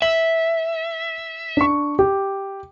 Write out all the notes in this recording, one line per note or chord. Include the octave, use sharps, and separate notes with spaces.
E5 F#7
D4 C#6
G4